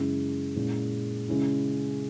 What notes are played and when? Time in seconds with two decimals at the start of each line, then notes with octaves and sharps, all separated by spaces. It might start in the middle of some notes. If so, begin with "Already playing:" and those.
Already playing: F#2 C#3 G#3 C#4 E4
0.55 A#2 G#3 C#4 E4
1.28 C#3 G#3 C#4 E4